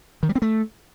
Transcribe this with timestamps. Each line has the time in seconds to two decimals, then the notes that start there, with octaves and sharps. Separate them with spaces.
0.23 D#3
0.29 G3
0.35 C4
0.42 A3